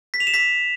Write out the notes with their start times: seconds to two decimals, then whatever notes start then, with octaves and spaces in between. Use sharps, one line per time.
0.14 B6
0.20 F7
0.27 E7
0.34 B6